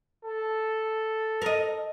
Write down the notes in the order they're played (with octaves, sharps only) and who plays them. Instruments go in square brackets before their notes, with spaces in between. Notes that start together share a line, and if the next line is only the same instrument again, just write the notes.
[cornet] A4
[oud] A#4 D#5